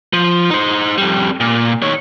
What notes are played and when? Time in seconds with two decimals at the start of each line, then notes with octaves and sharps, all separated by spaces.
0.13 F3
0.51 D#4 C5
0.98 F2 G3
1.40 A#2
1.82 D#3 C#5